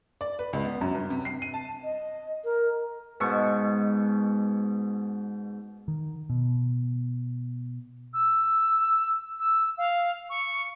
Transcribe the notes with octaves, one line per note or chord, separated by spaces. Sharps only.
D5
B4
C#2
B3
F#2
G2
C3
C7
D#7
A5
D#5
A#4
G#2 B2 C#6
D#3
B2
E6
E6
F5
C#6